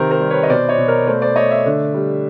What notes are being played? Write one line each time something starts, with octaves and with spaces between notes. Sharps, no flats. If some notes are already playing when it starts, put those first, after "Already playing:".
Already playing: C3 D#3 A#4 C5
A#4 C5
G3
B4 C#5
D#5
B2 C5 D5
C#5 D#5
B2
A#4 C5
A3 C5 D5
C5 D5
A3 C#5 D#5
D5 E5
D3
G3